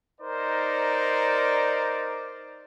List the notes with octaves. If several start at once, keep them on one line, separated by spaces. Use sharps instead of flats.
D#4 A#4 C5 D5